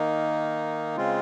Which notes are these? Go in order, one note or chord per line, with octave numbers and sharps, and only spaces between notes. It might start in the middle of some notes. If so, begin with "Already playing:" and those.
Already playing: D#3 A#3 D#4
C#3 G#3 C4 F4